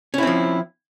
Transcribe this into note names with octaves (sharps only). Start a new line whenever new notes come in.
F3 C4 C#4 E4